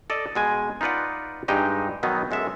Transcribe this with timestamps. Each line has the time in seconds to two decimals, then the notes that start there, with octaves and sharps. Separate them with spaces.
0.10 A4 D5 D#5
0.35 B2 G#3 G#5
0.81 D#4 F4 B4 D5 F#5
1.48 G2 G#3 D#4 G4 D#5
2.03 B2 D#3 F#3 B3 D#4
2.31 F#2 G#3 A4 E5